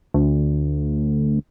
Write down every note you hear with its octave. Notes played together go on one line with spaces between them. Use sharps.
D2